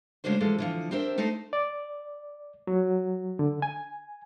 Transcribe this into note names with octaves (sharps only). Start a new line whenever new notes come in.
C#3 G#3 A3 D4 F#4 C5
E3 F3 G#3 G4 A4
D3 E3 F3
C4 D4 G4 A#4 C5 E5
A3 D#4 G4 A4 C5
D5
F#3
D3
G#5